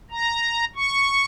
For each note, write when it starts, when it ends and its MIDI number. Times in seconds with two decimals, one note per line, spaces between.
0.11 0.65 82
0.76 1.25 85